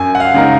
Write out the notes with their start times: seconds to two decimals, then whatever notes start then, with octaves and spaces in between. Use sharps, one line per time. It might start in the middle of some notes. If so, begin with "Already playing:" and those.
Already playing: F#2 G#5
0.15 F#5
0.20 F5
0.34 C#3 G#3 D#4 A#4